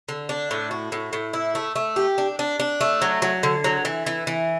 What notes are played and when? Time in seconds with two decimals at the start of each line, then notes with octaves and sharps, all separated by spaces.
0.09 D3
0.29 D4
0.51 A2
0.71 F#4
0.92 A2
1.13 A2
1.33 E4
1.55 A3
1.76 A3
1.96 G4
2.18 D4
2.39 D4
2.60 D4
2.81 A3
3.02 F#3
3.22 F#3
3.43 D3
3.64 F#3
3.85 E3
4.07 E3
4.27 E3